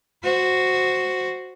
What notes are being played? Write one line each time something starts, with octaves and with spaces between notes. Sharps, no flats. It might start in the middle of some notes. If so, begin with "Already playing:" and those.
F#4 C5